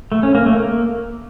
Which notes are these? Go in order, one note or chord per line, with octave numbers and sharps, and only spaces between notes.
A3
C#4
A#3
A3
A#3